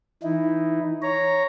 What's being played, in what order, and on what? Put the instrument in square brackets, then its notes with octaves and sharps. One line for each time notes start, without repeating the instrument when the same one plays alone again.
[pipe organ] E3 D#4 E4
C#5 A#5